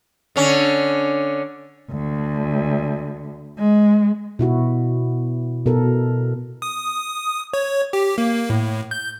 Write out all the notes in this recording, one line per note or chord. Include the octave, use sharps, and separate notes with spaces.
D3 C#4
D2
G#3
B2 E4 F#4
B2 A4 A#4
D#6
C#5
G4
A#3
A2
G6